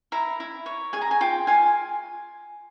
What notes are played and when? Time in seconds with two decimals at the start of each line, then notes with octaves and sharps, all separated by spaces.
0.12 E4 A#5
0.40 E4
0.66 C#5
0.93 G#4 G#5
1.02 A#5
1.11 G#5
1.21 F4 G5
1.47 F4 G#5